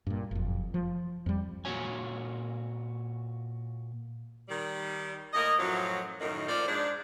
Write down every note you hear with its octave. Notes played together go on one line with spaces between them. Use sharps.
G2 A#2
F#1 F2
F3
F2 G3
A#2 F#4 C#5 G#5
D#3 G3
A2 A#3 D#5
F#2 A2 F3 F#3
F#2 A2 D#3
A#2 F3 F4 C5 D5
G#2 F3 G#3 D4